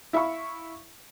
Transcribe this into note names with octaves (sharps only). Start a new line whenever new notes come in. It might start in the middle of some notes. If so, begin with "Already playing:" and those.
E4 E5 F5 B5 C#6